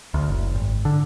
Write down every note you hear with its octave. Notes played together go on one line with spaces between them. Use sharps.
D2
F#1
G#1
D3